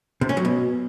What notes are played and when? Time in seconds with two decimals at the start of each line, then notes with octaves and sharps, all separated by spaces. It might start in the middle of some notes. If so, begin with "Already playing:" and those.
0.21 C3
0.29 C#4
0.37 F#3
0.45 B2